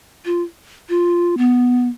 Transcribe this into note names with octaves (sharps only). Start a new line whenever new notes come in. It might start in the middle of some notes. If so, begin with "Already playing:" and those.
F4
F4
B3